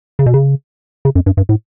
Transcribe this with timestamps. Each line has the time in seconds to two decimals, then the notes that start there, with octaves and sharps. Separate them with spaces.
0.19 C#3
0.26 B2
0.34 C#3
1.05 C#3
1.15 F#2
1.26 G2
1.37 G2
1.49 A2